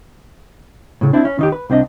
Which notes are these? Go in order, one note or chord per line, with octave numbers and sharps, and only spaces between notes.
A2 C#3
C4 D4 E4
C#4
D#3 D#4 G4
B4
C2 C4 D4 D#5